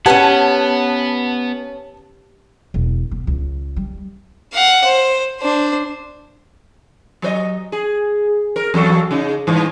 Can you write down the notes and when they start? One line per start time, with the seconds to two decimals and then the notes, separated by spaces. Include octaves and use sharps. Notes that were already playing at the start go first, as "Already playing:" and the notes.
0.06 B3 C#4 G4 B4 F#5 A5 G#6
2.74 E1
3.11 B3
3.27 C#2
3.76 G3
4.53 F5 F#5
4.85 C5
5.40 D4 C5
7.22 F#3 C5 D#5
7.72 G#4
8.56 A#4
8.74 E2 F#3 A4
9.11 C#3 D#4
9.47 G2 E3